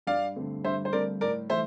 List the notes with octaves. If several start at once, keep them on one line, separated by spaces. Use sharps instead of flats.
G2 D5 F5
D3 A3 C4
G2 C5 E5
C5
D3 A3 C4 A#4 D5
A2 A#4 D5
E3 A3 C5 E5